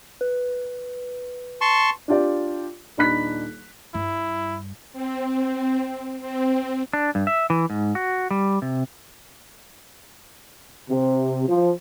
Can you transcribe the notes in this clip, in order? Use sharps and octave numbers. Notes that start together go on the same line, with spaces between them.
B4
A5 C6 C#6
D4 F4 G4 D5
D#1 D4 D#4 B5 F#6 B6
G2 E4
C4
C4
D4
G2
E5
E3
G#2
F#4
G3
C3
C3
F3